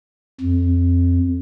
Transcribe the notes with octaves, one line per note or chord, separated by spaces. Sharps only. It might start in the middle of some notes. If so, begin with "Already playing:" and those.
F2